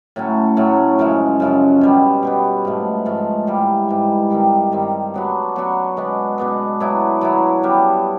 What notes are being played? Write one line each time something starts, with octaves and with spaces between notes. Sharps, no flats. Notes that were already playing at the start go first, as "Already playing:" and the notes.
A2 F#3 A3 C#4
A2 F#3 A3 C#4
F#2 C#3 F3 G#3
F#2 C#3 F3 G#3
B2 G3 B3
B2 G3 B3
G#2 F3 A3
G#2 F3 A3
G#2 E3 G3
G#2 E3 G3
G2 D#3 G3 C4
G2 D#3 G3 C4
F#3 B3 D4 F#4
F#3 B3 D4 F#4
B2 G#3 B3 D4
B2 G#3 B3 D4
F#3 B3 E4
F#3 B3 E4
G3 B3 D4